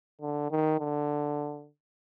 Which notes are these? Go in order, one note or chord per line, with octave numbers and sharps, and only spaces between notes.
D3
D#3
D3